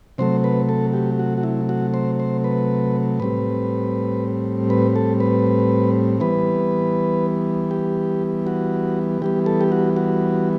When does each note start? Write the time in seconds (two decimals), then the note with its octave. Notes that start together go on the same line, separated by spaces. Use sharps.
0.18 C3 F#3 A3 C5
0.44 B4
0.69 A4
0.93 G4
1.19 F#4
1.38 F#4
1.43 E4
1.69 F#4
1.94 C5
2.20 C5
2.44 B4
3.20 A2 G3 C4 B4
4.70 B4
4.96 A4
5.20 B4
6.20 E3 G3 B3 B4
7.71 G4
8.47 F#4
9.22 E3 G3 B3 G4
9.46 A4
9.61 G4
9.72 F#4
9.96 F#4